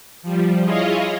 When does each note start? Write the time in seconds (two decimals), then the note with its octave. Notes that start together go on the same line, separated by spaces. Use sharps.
0.23 F3 G3
0.63 E4 F4 G#4 C#5 D#5 F5